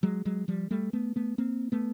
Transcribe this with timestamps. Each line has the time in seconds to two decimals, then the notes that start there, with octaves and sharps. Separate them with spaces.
0.03 F#3 G#3
0.25 F#3 G#3
0.48 F3 G3
0.71 G3 A3
0.93 A3 B3
1.16 A3 B3
1.38 A#3 C4
1.72 A3 B3